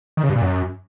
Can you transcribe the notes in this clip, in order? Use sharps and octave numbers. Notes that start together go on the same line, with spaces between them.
D#3
C#3
G2
A#2
F#2